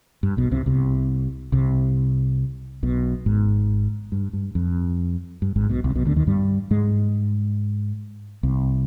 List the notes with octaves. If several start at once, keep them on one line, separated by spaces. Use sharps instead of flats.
G2
B1 B2
C2 C3
C2 C3
C2 C3
B1 B2
G#1 G#2
G2
G2
F2
G2
G#1 G#2
B1 B2
C2 C3
B1 B2
D2 D3
D#2 D#3
G2 G3
G#2 G#3
C2 C3